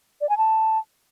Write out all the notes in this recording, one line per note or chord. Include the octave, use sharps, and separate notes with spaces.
D5
G#5
A5